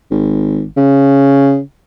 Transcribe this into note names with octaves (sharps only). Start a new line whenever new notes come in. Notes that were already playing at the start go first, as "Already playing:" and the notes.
G#1
C#3